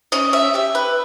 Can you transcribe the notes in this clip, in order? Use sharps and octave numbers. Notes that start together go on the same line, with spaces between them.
C#4 D#5
E5
G4 E5
B4